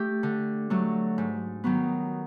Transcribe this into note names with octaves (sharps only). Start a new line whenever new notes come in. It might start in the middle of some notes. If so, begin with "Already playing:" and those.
Already playing: A3 G4
D3
F#3 A3
G#2
D#3 F#3 B3